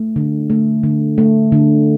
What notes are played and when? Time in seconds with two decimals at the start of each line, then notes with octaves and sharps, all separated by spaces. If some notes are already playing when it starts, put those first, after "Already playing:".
Already playing: A3
0.16 D3
0.50 A3
0.83 D3
1.18 A3
1.52 D3